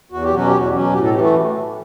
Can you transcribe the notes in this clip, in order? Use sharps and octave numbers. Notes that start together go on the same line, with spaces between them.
E2 F#4
G4
B2 F#3 C#4 F#4
G4
E2 F#4
B2 F#3 C#4
A2 G4
A4
E3 A3 G4
F#4